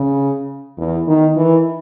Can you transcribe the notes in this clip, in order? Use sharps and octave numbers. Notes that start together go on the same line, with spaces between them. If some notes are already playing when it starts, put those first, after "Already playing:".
Already playing: C#3
E2
D#3
E3